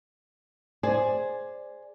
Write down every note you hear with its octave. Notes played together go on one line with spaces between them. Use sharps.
G#4 C5 D5